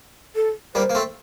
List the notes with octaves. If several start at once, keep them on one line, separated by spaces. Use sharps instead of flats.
A4
G3 A#3 C5
A#3
A3 C4